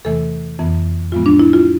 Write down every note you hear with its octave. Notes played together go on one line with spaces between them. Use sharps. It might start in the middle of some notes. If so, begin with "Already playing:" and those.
E2 C3 E3 A3 A4
F2 E3 B3
A2 F3 G#3 B3 F4
D4
E4
F4